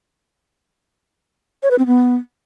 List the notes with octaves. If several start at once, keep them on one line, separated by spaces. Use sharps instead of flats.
C#5
B4
C4
B3